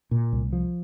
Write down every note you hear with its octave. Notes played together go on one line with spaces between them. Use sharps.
A#2
C2
F3